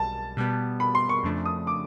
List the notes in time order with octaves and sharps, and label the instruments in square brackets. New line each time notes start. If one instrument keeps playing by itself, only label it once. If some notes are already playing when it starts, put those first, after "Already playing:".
Already playing: [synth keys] B1 G3 [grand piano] A5
[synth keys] B2 G3 B3
[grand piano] B5
C6
C#6
[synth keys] F2 C#3 F3 A3 D4
[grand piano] D#6
D6